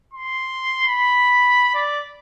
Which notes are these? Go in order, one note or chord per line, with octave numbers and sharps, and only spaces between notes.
C6
B5
D5